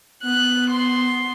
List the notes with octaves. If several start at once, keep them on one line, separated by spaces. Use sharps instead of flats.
B3 F#6
C6